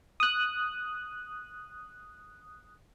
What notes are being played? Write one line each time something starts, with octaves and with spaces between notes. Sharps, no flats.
D#6 F#6